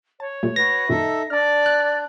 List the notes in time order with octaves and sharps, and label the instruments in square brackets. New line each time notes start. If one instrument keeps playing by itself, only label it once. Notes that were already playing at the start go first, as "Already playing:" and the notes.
[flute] C#5 [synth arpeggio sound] A5
[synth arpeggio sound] A#2 G3 A3
[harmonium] F#4 B4 [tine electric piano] A#6
[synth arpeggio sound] F#2 A#2 D#3 [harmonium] D#4 A4 E5 [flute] E6
[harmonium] D4 [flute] D5 [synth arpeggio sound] A5 F6
[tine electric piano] F#6